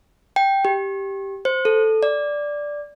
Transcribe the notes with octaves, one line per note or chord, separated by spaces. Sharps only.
G5
G4
C5
A4
D5